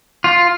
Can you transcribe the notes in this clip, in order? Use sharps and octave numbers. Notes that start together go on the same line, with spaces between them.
F4